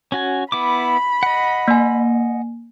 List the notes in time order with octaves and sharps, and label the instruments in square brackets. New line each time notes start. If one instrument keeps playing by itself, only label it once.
[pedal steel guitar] C#4 F#4 G#5
[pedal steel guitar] B3 E4 D6 [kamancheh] B5
[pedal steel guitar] D#5 F#5
[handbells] A#3 G#5